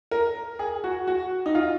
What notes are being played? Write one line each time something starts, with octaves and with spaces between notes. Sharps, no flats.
A#4
G#4
F#4
F#4
D#4
F4